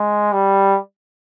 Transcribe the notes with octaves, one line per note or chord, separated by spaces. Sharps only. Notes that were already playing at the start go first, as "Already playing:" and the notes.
Already playing: G#3
G3